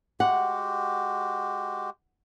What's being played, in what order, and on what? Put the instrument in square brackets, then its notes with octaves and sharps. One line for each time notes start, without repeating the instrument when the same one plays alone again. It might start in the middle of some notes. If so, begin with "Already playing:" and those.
[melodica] G#3 F#4 G4 [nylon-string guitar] F#5